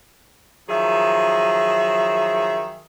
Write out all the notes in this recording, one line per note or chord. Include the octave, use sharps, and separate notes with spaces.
D#3 F3 F#3 G#4 E5